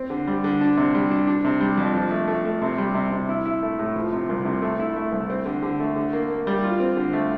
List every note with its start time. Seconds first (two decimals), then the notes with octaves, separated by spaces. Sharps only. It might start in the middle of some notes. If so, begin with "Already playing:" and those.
Already playing: C4
0.10 D3
0.27 G3
0.44 D3
0.61 D4
0.77 C3
0.95 G3
1.11 D4
1.27 D4
1.45 C3
1.61 G3
1.77 F2
1.95 F3
2.11 A3
2.27 A3
2.45 A3
2.62 C3
2.78 G3
2.94 C3
3.12 C3
3.29 E4
3.45 E4
3.62 A3
3.79 A2
3.96 F3
4.13 C3
4.29 C2
4.45 C3
4.62 A3
4.79 E4
4.96 A3
5.12 C2
5.30 C4
5.45 D3
5.62 D3
5.80 A3
5.96 D3
6.13 A#3
6.30 A#3
6.47 G3
6.64 F4
6.80 C4
6.97 D3
7.13 A3